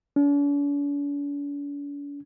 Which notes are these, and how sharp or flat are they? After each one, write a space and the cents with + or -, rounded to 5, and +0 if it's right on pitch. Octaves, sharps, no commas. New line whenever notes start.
D4 -45